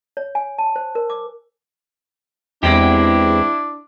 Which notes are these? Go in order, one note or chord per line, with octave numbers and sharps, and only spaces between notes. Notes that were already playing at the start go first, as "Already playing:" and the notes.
C#5
G#5
A5
C5
A#4
D6
E2 G#3 C4 D4 E4 G4